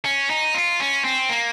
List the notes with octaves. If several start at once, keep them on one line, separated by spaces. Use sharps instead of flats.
C#4
D#4
F4
C#4
C4
A#3